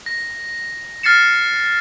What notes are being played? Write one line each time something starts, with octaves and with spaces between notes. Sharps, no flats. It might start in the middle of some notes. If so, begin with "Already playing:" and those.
A#6
F6 A6 C7 C#7 E7